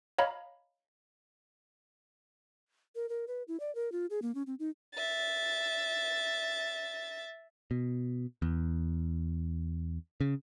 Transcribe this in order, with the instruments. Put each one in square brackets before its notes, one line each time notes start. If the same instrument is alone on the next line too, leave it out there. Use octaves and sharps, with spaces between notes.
[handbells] C#5 D#5 F5 A#5 B5
[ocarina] A#4
A#4
B4
E4
D5
A#4
F4
G#4
A#3
C#4
C4
D#4
[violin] E5 A6
[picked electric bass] B2
E2
C#3